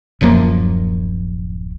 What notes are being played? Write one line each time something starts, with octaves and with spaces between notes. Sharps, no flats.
D1 F#2 F3 A#3